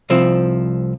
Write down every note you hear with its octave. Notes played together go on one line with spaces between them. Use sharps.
C2 F3 C4